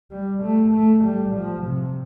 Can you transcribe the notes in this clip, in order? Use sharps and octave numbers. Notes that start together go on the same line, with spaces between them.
G3
A3
A3
G3
F3
C3